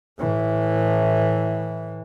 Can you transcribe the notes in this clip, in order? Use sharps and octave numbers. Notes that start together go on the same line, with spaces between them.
A2 E3